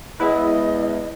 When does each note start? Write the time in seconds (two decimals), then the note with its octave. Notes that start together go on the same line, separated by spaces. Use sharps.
0.20 E2 G#3 B3 E4 B4 D#5